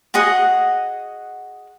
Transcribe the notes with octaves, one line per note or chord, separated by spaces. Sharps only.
F#4 G#4 D#5 F#5